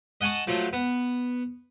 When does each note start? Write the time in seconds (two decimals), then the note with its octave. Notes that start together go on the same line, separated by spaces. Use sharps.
0.21 D#5 F#5 G#5 A5 C#6
0.47 F3 F#3 A3
0.73 B3